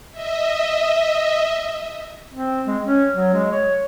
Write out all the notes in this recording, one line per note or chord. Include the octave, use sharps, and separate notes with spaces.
D#5 E5
C4
G#3
C#4
F#3
G#3
C#5